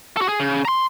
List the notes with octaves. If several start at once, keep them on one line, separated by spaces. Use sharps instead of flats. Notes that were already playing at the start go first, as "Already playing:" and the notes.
F#4 A4
G#4
C#3
A#5 C6